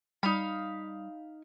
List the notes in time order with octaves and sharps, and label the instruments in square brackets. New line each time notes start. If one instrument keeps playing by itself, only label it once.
[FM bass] G3 [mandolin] D#4 F5 B5